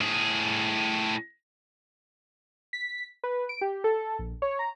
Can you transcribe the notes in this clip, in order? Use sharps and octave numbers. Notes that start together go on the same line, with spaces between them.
A2 G#4
B6
B4
D7
G4
A4
A#1
C#5
A#5